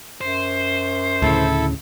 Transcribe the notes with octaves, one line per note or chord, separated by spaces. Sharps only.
F#2 C5
D2 A2 C#3 E4 A4